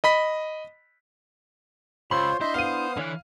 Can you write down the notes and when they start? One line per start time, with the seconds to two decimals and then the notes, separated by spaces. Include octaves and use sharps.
0.04 D#5 B5 B6
2.11 C#2 F4 C5 C#5 B5 C6 E6
2.41 D4 E4 C5 D#5 E5
2.54 B3 F5 D#6 D#7
2.97 D3 E3 C#5 F#6